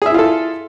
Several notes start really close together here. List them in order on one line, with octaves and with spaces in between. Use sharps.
G#4 E5 E4 F4 A4